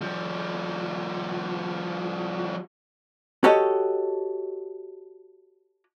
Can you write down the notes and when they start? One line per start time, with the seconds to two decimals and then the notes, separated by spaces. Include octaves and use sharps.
0.01 F3 G3
3.44 F#4 G4 A4 C#5 D#5